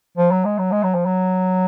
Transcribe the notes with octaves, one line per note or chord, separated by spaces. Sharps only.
F3
F#3
G#3
F#3
G#3
F#3
F3
F#3